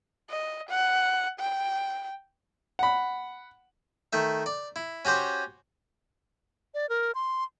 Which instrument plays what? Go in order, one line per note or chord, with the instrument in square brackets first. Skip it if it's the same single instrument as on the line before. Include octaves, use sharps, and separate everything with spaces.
[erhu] D#5
F#5
G5
[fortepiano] F#5 B5
[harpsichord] D#3 A3 E5
D5
E4
C#4 F#4 G4 C5 C#5
[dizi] D5
A#4
C6